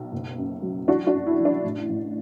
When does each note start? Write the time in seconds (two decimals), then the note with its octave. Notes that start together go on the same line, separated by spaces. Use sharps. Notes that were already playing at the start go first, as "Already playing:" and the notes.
Already playing: B1
0.12 F#1
0.38 F#2
0.62 F#3
0.88 E3 D4 F#4
1.07 D4 F#4
1.13 F#2
1.27 E4
1.38 E3
1.45 D4
1.64 A1
1.89 A1